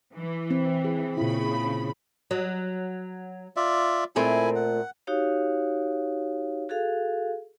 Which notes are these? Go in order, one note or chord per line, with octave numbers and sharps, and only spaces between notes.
E3
C4
G#4
A#2 C#3 E4 B5
F#3
F4 D5 E5
A#2 A3 C4 E4 G#5
F#5
D#4 F#4 G4 C#5 F5
F#4 G#4 A4 F5